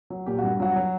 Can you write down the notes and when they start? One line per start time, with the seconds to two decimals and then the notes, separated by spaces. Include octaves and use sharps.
0.10 F#3
0.26 A#2 G4
0.39 G2 F#4
0.60 F#3 F#4
0.76 F#3